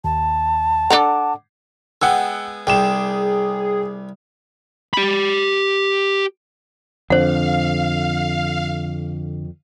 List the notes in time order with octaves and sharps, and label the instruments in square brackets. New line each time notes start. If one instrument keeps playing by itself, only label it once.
[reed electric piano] D#2 [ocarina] A5
[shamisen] D4 A4 A#5 [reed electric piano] F#5 D6
[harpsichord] G#3 B3 [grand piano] F#5 G5 E6
[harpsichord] C2 C3 [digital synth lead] G#4 [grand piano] G5 E7
[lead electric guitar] G4 B5
[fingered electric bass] F2 [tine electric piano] D3 [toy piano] C5 F#5 [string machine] F5